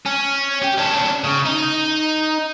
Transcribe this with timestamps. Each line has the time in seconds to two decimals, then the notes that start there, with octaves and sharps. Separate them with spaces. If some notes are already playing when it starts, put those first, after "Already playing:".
0.06 C#4
0.62 G4
0.78 C#4 D4
1.24 C#3
1.46 D#4